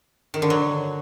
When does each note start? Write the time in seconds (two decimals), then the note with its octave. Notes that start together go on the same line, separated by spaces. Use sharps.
0.34 D#3
0.42 D3
0.50 F#3